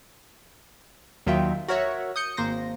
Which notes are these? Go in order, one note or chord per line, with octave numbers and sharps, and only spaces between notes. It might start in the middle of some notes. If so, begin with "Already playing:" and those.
D#2 D#3 F#3 F4 E5 G5
F#4 A#4 C#5 E5
D#6 G6 C#7
G#1 A#3 C5 A#6